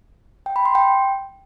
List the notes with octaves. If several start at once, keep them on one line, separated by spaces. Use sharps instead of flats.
G5
B5
C6
G5